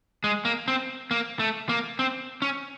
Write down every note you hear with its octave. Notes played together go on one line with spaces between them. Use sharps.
G#3
A#3
C4
A#3
A3
A#3
C4
C#4